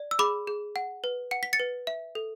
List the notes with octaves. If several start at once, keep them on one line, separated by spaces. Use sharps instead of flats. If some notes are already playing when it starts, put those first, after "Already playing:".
Already playing: D5
E6
G#4 B5 D6
G#4
F#5
B4
F#5 C#7
B6
A6 C#7
B4
E5
A4